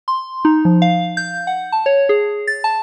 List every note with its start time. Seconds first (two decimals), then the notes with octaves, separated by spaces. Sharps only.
0.08 C6
0.45 D#4
0.65 F3
0.82 F5
1.17 G6
1.47 F#5
1.72 A5
1.86 C#5
2.09 G#4
2.47 A6
2.64 A5